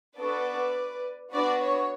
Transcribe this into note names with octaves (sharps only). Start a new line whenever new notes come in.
B3 D4 F#4 A4 B4 D5
B3 D4 F#4 B4 D5
C#5